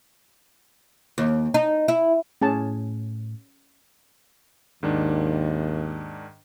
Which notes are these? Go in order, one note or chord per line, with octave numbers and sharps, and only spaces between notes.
D#2
D#4
E4
A2 C#4 G#4 A5
D#2 G#2 D#3 D4